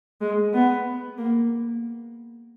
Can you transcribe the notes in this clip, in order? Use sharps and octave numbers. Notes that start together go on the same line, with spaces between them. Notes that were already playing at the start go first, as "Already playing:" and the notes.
G#3
B3
A#3